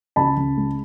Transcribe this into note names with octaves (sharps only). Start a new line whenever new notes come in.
C#2 A5 B5
C#2
G#3